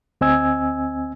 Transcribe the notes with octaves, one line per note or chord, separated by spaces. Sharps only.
D2 C4 D#5 G#5 E6 G#6